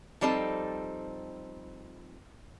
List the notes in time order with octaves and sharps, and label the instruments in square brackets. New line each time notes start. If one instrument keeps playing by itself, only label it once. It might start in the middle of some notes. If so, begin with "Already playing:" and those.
[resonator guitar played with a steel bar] F3 G3 C4 D#4 A4